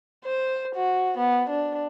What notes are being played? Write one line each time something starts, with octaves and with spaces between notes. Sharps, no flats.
C5
F#4
B3
D4